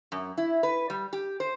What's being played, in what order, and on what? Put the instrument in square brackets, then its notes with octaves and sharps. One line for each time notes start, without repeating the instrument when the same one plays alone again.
[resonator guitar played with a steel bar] F#2
E4
B4
G3
G4
C5